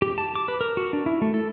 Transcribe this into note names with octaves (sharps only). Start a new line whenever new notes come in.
G4
A5
D6
B4
A#4
F#4
D4
E4
A3
A4